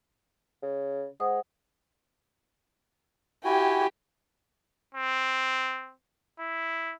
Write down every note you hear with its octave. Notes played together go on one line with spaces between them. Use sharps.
C#3
G#3 C5 F#5 D#6
E4 F#4 G4 G5 G#5
C4
E4